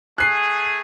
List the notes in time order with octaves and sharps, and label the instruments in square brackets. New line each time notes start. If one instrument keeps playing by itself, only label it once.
[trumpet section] A3 G#4 [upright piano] F#6 C7